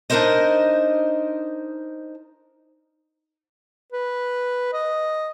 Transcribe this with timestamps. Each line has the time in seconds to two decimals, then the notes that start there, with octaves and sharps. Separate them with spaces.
0.10 D4 D#4 F4 A#4 C5 D#5
3.93 B4
4.73 D#5